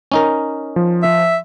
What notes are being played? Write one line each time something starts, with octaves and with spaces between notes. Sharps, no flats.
C#4 D#4 A#4
F3
E5